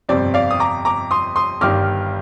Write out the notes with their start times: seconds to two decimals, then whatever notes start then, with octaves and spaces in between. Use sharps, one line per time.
0.09 G1 F2 C3 G3 C4 D5
0.34 D5 F5
0.51 D#6
0.60 A#5 D6
0.85 A#5 D6
1.11 C6 D#6
1.36 C6 D#6
1.61 G1 G2 D#3 G3 D6 F6